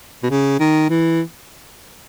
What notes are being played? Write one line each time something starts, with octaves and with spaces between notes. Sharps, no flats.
B2
C#3
D#3
E3